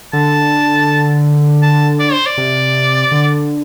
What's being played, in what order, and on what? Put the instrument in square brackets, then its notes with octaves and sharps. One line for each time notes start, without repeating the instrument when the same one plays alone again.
[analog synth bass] D3 [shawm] A5
[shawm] A5
D5
C5
D5
[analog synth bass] C3
D3